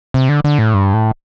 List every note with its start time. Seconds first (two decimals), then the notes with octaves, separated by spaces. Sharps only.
0.14 C3
0.29 D3
0.44 D3
0.59 A2
0.74 G2
0.94 A2